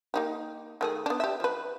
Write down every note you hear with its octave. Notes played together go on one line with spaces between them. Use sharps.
A#3 D#4 G4
D#3 A3 G#4
B3 D4
G4 E5
F3 B4